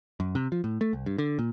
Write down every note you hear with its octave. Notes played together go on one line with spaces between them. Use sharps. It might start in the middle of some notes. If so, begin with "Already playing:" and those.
F#2
C3
F3
A2
A3
C2
G2
D3
A#2